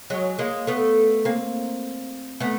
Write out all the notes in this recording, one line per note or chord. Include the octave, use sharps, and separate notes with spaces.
F#3 G#3
G#3 A#3
A3 B3
A#3 C4
A3 B3